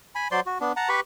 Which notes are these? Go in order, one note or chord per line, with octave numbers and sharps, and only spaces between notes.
G#5 B5
F#3 C5 D5 C6
F#4
B3 D4
F#5 A5 A#5
G4 B4 B5 C#6